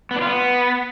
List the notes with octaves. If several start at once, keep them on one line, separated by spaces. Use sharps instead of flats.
B3
D4
F4
B3